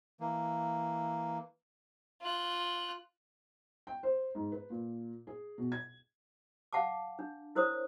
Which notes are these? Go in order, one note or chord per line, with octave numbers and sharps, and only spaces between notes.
E3 A#3
F4 F#6
G5
C5
G#2
B4
A#2
G#4
B2
G#6
F5 F#5 A5 D6
D4
E4 A#4 C5 C#5 D#6